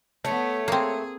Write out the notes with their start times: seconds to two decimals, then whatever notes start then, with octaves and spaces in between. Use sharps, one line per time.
0.25 A3 B3 C#5
0.68 A#3 C4 G#4